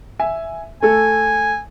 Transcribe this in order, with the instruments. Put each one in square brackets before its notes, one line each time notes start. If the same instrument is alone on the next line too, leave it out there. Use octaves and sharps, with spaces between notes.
[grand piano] E5 G#5
[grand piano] A3 A4 [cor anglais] G#5